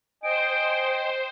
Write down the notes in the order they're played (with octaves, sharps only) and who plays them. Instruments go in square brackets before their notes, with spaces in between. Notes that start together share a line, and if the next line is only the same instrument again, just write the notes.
[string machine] C5 [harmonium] D#5 G5 G#5 [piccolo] D7